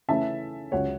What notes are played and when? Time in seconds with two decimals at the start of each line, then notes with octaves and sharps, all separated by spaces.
0.09 C#3 E3 A3 C#4 E4 E5 A5
0.72 C#2 C#3 F#3 C#5 F#5